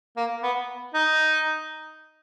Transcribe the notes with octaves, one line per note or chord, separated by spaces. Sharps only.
A#3
B3
D#4